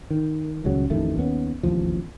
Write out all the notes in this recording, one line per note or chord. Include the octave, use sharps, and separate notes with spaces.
D#3
D#1 C#2 C#3 F#3
A1 F2 D#3 A3
D#2 B3 C#4
E1 A1 D#2 F3